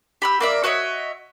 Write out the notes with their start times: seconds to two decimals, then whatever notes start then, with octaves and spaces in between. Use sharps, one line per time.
0.22 G4 B5 E6
0.40 A#3 D5 E5
0.64 F#4 C#5 D#5 E5